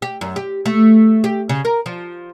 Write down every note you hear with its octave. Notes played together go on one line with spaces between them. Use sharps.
G4
F#2
G4
A3
G4
C#3
A#4
F3